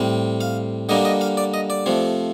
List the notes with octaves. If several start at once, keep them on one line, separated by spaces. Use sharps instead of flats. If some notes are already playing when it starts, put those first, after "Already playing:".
Already playing: A2 G3 C4
F5
D3 G3 A#3 D4 D#5
D#5
F5
D5
D#5
D5
C3 F3 A3